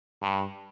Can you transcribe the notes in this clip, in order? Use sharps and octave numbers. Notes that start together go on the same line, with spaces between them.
G2